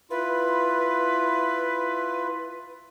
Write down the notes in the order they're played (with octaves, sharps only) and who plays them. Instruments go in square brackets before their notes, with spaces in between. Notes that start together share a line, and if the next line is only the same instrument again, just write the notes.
[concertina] E4 F4 [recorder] B4